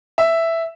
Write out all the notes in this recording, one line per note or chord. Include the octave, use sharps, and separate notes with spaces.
E5